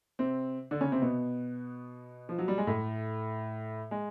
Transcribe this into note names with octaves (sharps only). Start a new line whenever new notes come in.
C3 C4
D3 D4
C#3 C#4
C3 C4
B2 B3
F3
F#3
G3
G#3
A2 A3
G#3